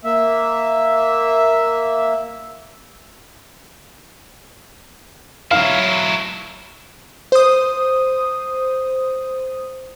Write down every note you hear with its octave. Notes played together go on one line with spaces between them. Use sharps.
A#3 E5
F#3 E4 F5
C5 D#6